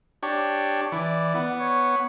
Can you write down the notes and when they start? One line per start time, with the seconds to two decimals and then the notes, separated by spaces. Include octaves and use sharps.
0.23 D4 G4 C#5
0.92 E3 D5
1.35 B3
1.60 C#5